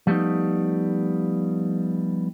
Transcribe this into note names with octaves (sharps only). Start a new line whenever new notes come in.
F3 G3 A3 B3 D#4